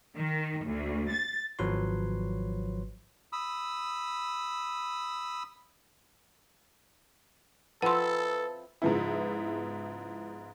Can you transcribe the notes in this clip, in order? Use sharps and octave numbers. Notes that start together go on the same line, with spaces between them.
D#3
D2
A6
G#1 F3 F#3 B4 C#5 C6
B5 D#6 E6
F3 C4 E4 A4 B4 F#5 C6
G#2 C#3 F3 B3 E4